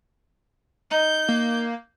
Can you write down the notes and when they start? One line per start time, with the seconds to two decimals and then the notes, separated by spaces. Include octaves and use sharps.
0.91 D#4 G6
1.29 A#3